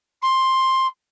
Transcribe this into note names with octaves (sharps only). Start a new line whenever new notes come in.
C6